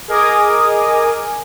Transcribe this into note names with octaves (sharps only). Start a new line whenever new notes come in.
G#4 A#4 D#5 G#5 D6 D#6